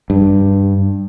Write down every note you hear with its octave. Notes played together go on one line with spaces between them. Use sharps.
G2